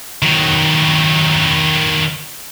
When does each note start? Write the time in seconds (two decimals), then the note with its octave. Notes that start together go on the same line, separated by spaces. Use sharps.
0.22 D#3 F#3